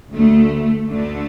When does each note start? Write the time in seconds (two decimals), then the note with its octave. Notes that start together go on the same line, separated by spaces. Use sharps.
0.14 D2 D3 A3
0.90 D2 D3 A3